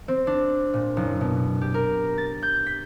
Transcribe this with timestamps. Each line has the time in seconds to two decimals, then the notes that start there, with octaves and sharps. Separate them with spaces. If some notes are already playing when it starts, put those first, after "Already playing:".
0.08 C4
0.27 D4
0.74 A#2
0.97 F#1
1.21 B2
1.61 G4
1.74 A#4
2.18 A6
2.42 G6
2.67 B6